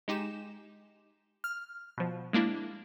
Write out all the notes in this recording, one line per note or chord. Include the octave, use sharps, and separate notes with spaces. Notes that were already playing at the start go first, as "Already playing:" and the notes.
G#3 D#4 G4 E7
F6
B2 F3
G#3 A#3 D4 E4